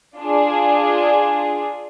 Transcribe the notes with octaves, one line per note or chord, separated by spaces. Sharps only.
D4 F4 G#4